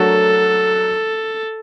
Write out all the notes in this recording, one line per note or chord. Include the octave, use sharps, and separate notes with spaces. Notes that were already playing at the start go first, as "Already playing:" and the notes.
Already playing: F#3 A3 D4 F#4 A4 A#4